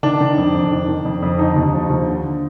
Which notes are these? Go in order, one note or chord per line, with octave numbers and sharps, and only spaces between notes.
D#3 D4
D#3
F2
F2
D#3
D#3
F2
F2
D3 D#4
D#2
F3
D#2
D3